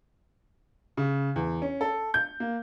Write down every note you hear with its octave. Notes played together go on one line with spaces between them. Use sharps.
C#3
E2
C#4
A4
G6
A#3